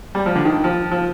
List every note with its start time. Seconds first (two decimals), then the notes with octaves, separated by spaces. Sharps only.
0.15 G3
0.26 F3
0.35 D3
0.45 D#3
0.64 F3
0.91 F3